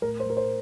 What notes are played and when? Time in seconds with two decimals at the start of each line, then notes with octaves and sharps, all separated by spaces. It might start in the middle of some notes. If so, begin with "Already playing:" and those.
0.02 A2 A#4
0.20 C5
0.26 A2 A#4
0.37 C5